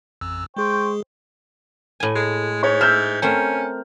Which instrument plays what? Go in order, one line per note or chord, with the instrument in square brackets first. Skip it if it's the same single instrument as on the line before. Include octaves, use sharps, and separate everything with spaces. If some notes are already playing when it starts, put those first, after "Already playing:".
[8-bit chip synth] A1 F2 E6
[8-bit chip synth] G#3 G#4 [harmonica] C5 G5 C#6
[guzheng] A2 G#5
[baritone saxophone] G#3
[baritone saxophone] G#2 [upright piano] C#5
[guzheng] E5 [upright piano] F6 G6
[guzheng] A3 C4 A#4 [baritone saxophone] C#4